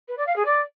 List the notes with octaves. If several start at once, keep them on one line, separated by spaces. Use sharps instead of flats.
B4
D5
F5
G#4
D5